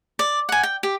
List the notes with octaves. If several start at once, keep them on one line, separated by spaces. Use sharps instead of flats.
D5
F#5 G#5
G5
G4